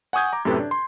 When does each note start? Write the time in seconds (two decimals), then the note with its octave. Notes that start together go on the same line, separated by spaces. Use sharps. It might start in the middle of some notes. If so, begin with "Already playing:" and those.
0.13 F#5 G#5 C#6 D#6 G6 G#6
0.33 A#5 D6
0.45 F#2 A2 C3 G4 A4 B4
0.59 D4
0.71 C6